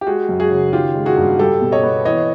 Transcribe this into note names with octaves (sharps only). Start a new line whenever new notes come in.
G4
G#3 F#4 G#4
F#2
F#4 G#4
C#3
D#3 F4 G4
G#3
F#4 G#4
G2
G3 G4 A4
B2
C#5 D#5
B3
E3 C#5 D#5